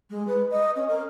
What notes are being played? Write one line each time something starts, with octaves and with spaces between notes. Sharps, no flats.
G#3
B4
D#5
C#4
A#4